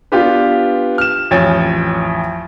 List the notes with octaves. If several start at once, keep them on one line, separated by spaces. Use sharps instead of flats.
B3 D4 F4 G4 B4
F6 E7
A1 F2 C#5 G5 G#5 A6